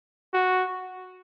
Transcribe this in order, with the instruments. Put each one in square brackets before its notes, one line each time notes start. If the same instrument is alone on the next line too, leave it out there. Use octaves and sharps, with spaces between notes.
[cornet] F#4